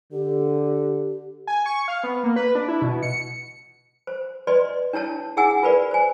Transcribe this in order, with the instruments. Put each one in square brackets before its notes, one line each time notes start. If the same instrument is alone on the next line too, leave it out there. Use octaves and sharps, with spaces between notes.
[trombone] D3 [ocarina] G4
[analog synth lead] G#5
C#6
F5
B3
A#3
B4
D4
E4
B2
C#7
[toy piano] C5
B4 D5 D#5 C6
D4 E4 C#5 A5
E4 G#4 E5 F#5 G#5 E6
F4 A#4 B4 D5
C5 G#5